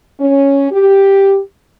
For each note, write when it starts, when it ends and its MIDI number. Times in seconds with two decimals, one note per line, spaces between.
0.20 0.68 61
0.72 1.40 67